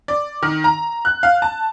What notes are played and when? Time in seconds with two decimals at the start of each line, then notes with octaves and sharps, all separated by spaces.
0.08 D5
0.42 D#3
0.64 A#5
1.05 F#6
1.23 F5
1.42 A5